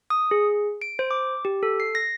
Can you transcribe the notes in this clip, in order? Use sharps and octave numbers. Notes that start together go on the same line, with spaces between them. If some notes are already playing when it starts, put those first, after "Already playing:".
D#6
G#4
D7
C5
D6
G4
A4
C7
A#6